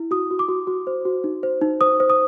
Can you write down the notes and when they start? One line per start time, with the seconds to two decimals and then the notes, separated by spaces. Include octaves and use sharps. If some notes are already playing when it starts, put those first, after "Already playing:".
Already playing: E4
0.11 F#4 D#6
0.31 F#4
0.39 D6
0.49 F#4
0.67 F#4
0.87 C5
1.05 F#4
1.24 D#4
1.43 C5
1.61 D#4
1.81 C5 D#6
2.00 C5
2.10 D#6